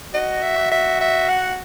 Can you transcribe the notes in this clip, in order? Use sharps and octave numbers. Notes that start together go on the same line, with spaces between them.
F#4 D#5
E5
F#4
E5
E5
F#5